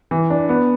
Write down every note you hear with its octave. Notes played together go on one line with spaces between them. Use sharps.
E3
D4
B3